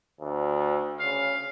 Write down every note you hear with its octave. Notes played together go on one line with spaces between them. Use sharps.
D2
C#3 F5